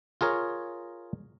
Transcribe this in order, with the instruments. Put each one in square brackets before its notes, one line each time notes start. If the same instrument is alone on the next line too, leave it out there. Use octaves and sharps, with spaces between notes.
[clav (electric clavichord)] F4 G#4 A#4 C#5